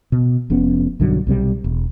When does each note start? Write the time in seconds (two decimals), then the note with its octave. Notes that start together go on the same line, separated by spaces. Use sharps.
0.12 B2
0.50 F1 F2 B3 C#4
1.00 B1 G2 D3 F#3
1.27 B1 C3 G3
1.64 E1